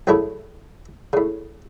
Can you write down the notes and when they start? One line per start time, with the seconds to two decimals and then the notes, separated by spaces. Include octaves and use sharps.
0.07 C2 F#2 C#3 A3 E4 C#5
1.13 A2 C#3